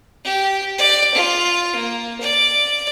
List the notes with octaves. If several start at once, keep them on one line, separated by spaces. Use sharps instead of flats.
G4
D5
F4
A#3
D5